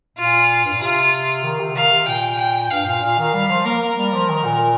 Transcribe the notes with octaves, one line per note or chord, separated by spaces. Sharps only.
A#2 F4
G2
A#2
C3 F4
D#3
C3
D#3 F5
C3
A#2 G5
G5
G2 F5
A#2
A#2
D#3
G3
F3
A#3 A#4
A#3
G3
F3
D#3
A#2